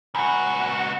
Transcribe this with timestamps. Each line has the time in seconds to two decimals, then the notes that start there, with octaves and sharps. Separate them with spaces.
0.15 C#2 F#4 G#5 A#5 B5